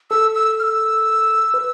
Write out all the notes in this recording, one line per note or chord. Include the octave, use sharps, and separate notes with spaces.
A4 E6
E6
F6
E6
B4